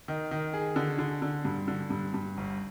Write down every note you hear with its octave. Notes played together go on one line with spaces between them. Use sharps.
D#3
D#3
G#4
D3
D3
D3
G2
D3
G2
G2
G1